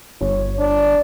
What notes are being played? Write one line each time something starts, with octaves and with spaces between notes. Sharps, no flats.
G1 C#5
D4